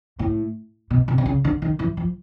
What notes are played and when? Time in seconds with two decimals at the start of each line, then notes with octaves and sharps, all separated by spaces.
0.19 A2
0.91 B2
1.08 C3
1.18 C3
1.26 C#3
1.44 D3
1.62 D#3
1.79 E3
1.97 F3